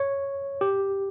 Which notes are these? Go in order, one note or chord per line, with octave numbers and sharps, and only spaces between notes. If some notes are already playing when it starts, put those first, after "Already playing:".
Already playing: C#5
G4